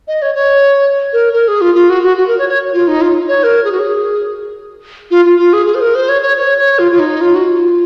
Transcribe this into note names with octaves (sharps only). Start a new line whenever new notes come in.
D#5
C#5
C#5
A#4
A#4
G#4
F4
F4
F#4
F#4
F#4
A#4
C#5
C#5
F4
D#4
F4
C#5
A#4
G#4
F#4
G#4
F4
F4
F4
G#4
G#4
C5
A#4
C5
C#5
C#5
C#5
C#5
F4
F4
D#4
F4
F#4
F4